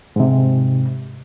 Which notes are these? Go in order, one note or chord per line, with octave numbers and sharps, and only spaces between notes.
G#2 C3